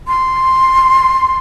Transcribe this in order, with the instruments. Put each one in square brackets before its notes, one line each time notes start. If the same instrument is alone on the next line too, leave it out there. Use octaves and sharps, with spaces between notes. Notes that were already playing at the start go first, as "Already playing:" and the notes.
[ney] C6